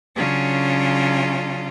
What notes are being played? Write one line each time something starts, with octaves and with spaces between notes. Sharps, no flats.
C#3 F#3 C#4 D4 F4